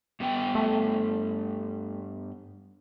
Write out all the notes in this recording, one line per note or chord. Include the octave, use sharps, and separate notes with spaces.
G2 B3 G5
A3